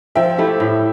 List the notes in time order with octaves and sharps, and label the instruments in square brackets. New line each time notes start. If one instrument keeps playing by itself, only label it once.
[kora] F3 [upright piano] E5 G5
[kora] A3 E4 G4
A2